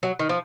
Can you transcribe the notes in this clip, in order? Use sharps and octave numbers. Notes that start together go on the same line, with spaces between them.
F#3
D#3
F3